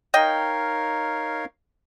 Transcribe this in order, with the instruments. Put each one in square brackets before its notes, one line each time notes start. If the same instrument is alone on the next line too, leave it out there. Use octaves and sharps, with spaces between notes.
[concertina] D#4 A#4 C#5 F5 [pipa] D#5 G5